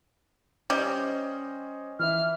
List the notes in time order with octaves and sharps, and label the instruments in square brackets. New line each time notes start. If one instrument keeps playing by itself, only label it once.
[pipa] G3 [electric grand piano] C#4 C5 D#5
[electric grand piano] E3 E4 E5 [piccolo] F6